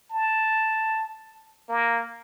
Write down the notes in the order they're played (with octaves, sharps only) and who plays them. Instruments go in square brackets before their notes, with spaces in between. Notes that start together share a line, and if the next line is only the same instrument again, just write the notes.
[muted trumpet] A5
A#3